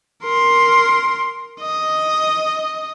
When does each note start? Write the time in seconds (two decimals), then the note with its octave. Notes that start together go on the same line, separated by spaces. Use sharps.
0.23 A#4 C6
1.61 D#5